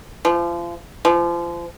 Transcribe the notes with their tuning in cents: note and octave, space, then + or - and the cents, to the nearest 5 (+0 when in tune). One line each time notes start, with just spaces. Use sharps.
F3 -30
F3 -30